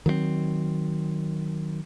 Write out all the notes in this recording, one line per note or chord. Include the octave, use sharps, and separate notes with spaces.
D#3 F#3 A3 C4